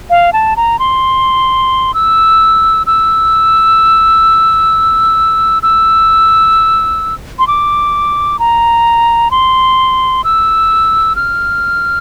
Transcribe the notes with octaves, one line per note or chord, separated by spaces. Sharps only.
F5
A5
A#5
C6
E6
E6
E6
C6
D6
A#5
C6
E6
F6